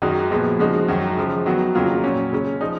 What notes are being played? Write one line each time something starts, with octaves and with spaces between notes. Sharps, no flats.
F#2 D#3 G#3 D#4 F#4
A#2 F3 G#3 B3 F#4
C#3 F3 G#3 D#4 F#4
F#2 D#3 F#3
C#3 F3 G#3
D#3 F#3 B3 F#4
F2 C#3 F#3 A#3 F4
A#2 F#3 C#4
C#3 G#3 C#4
F3 G#3 D#4